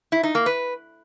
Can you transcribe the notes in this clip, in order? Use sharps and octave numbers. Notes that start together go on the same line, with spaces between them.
E4
D#4
A#3
B4